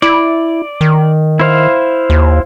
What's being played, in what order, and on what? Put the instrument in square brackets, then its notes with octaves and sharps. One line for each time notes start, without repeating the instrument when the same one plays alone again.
[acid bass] E4 [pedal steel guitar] D5
[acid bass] D#3
[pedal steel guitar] E4 C5 F5
[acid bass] D#2